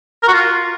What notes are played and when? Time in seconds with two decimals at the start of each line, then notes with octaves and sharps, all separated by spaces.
0.23 A#4
0.28 F#4
0.33 F4